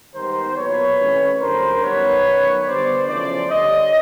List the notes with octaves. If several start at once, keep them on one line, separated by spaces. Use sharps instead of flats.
G#2 D#3 G3 B3 A#4 C5
A#2 F#3 B3 B4 C#5
C3 E3 A3 C#4
F#2 D3 G3 A#4 C5
F#2 D#3 G3 B3 B4 C#5
F#2 D#3 F#3 B3
D3 G3 B3 C5 D5
E2 C#3 F3 A3 C#4 C5 D5
G2 D3 G3 C#5 D#5